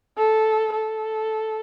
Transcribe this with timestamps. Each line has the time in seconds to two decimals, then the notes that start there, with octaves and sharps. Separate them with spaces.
0.18 A4
0.72 A4